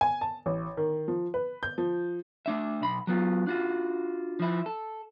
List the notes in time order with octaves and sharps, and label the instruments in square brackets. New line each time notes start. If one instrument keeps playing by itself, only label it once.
[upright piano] G#5
A5
A1
D#3
F3
B4
G6
F3
[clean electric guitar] A3 D4 E5
B1 B5
F#3 B3 F4
D4 F4 F#4
F3 E4
A4